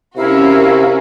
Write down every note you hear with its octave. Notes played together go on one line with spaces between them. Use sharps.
C3 C#4 E4 F#4 A#4 F5